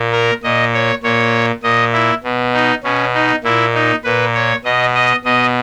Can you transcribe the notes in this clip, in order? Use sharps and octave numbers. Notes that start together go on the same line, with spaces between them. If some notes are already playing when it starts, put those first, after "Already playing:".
Already playing: A#2
A#4
A#2 D#5
C#5
A#2 C#5
A#2 D#5
E4
B2
D#4
B2 C#4
D#4
A#2 E4
D#4
A#2 B4
C#5
B2 D#5
D#5
B2 D#5